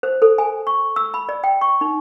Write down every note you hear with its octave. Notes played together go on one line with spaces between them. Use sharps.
C5
A4
G#5
C#6
E6
B5
D5
G5
C#6
D#4